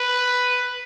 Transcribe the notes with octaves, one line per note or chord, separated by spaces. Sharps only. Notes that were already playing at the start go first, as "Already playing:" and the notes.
Already playing: B4